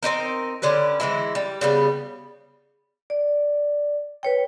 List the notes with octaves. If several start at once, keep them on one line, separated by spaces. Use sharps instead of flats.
C4 C#4 D#4 A#4
D3 C#4 G4 B4
E3 G#3 E4
G3
C#3 G3 B3
D5
B4 C#5 G5